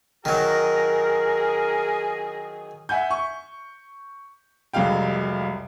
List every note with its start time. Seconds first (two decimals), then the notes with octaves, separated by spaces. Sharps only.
0.25 D#3 F#3 G#4 A#4
2.89 E5 F#5 G#5 G6
3.11 C#6
4.73 F1 C2 F#3 G#3 F5 G5